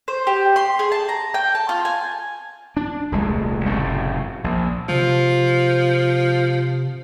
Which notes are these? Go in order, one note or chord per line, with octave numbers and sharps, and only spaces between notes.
C5
G4
C6
G#4
A5
A#5
G5
A5
F4
G#5
D4
D#1 C2 G#3 A3
F#1 F#2 A2 C3
A#1
C3 F3